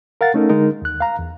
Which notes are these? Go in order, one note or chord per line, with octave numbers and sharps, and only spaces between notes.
A#4 F5 F#5 A6
A3 C#4 D#4 A4 A#4
D3 G#3 D#4 A#4
D#2 F#6
F5 A#5
E2